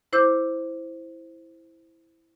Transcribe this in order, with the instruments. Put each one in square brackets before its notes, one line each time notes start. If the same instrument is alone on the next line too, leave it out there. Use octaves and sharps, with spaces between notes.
[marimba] E4 C5 D6 E6 G6